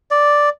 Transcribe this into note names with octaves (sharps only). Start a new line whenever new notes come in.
D5